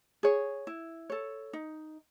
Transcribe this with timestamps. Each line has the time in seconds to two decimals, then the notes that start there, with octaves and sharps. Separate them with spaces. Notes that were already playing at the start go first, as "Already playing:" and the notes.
0.23 G#4 C#5
0.67 E4
1.10 A4 C#5
1.53 D#4